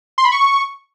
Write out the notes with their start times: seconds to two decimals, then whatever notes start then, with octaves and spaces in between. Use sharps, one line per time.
0.18 C6
0.25 B5
0.32 C#6